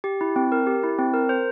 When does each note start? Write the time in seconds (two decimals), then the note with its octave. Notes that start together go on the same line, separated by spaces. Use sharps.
0.04 G4
0.21 E4
0.36 C4
0.52 A#4
0.67 G4
0.83 E4
0.99 C4
1.14 A#4
1.29 C5